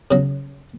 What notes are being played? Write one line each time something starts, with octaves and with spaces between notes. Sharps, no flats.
C#3 F#3